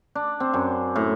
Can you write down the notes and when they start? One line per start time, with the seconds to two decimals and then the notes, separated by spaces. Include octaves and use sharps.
0.15 D4
0.40 C4
0.54 F#2
0.96 A2